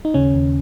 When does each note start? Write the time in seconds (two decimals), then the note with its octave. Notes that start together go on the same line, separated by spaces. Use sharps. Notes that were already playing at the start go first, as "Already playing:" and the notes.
0.05 D#4
0.14 D#2 C#3 C#4
0.34 D#2